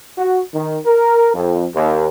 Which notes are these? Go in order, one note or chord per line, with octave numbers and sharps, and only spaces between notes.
F#4
D#3
A#4
F2
D#2